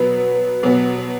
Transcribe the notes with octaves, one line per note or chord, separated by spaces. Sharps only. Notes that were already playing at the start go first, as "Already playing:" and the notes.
Already playing: B2 F#3 B3 B4
B2 F#3 B3